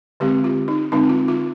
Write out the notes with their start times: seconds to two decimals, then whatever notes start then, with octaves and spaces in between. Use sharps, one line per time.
0.20 D3 G#3 C4 G4
0.44 F4
0.68 D#4
0.92 D3 G#3 C4 D#4
1.09 F4
1.28 F4